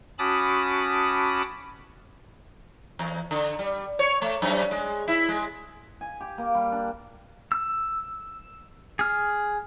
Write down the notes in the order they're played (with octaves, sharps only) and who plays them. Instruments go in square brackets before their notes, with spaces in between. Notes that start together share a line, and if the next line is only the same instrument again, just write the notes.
[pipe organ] C#4 F#4 A5 B5 D6 D#6
[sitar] E2
D3
G3
C#5
A3
F#2
G#3
E4
G#3
[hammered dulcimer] G#5
G4
A#3
G3
D4
[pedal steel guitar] E6
G#4 F6